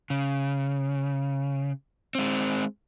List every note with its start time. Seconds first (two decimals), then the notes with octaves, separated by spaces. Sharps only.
0.10 C#3
2.15 G#3 C4